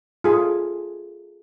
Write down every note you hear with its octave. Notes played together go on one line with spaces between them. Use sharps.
F4 G#4 A4